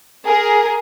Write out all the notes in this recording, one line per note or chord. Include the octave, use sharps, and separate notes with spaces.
G#4 A#4